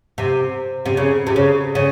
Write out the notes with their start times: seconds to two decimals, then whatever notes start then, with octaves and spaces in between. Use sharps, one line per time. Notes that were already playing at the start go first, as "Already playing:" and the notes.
0.18 C3
0.86 C3
0.97 C#3
1.27 C3
1.36 C#3
1.75 C#3